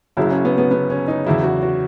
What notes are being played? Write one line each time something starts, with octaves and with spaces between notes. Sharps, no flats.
F#1 F#2 C#3 F#3 E4
C#4
B3
B3
B3
C#4
D#4
E2 C#3 F#3 E4
F#4
F#4